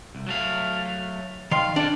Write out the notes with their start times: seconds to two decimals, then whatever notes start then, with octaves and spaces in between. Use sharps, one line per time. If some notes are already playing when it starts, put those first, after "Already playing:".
0.15 C2
0.27 F#3 A3 F5
1.51 D#3 F5 C6
1.76 D4 A4 D5